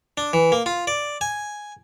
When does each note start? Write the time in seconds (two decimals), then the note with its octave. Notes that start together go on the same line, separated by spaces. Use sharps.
0.17 D4
0.33 E3
0.52 A#3
0.66 F4
0.87 D5
1.21 G#5